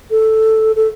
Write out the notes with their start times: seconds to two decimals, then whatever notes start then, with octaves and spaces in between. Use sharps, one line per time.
0.11 A4
0.76 A4